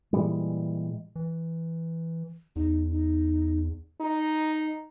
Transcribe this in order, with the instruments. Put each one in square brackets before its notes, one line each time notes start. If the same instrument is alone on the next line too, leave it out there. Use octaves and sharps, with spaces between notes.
[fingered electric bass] A#2 E3 G3 G#3
[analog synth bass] E3
[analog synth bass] E2 [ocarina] D#4
[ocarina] D#4
[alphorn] D#4